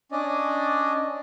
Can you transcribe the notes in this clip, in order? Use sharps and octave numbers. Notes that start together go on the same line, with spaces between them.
C#4 D4 D5 D#5